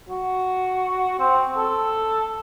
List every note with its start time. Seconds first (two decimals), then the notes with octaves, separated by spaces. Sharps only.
0.09 F#4
1.20 C4
1.57 A4